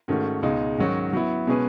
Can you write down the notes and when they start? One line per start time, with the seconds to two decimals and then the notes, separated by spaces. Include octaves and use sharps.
0.08 G#2 D#3 A3 C#4 F#4
0.43 C#2 B2 G#3 D#4
0.78 G#2 D#3 F#3 C#4 F#4
1.13 F#3 B3 E4
1.47 B2 G#3 C#4 G#4 B4